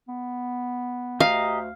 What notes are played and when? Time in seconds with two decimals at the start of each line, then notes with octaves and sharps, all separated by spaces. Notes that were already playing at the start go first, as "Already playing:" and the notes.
0.08 B3
1.20 D2 G4 D#5 F5 A#5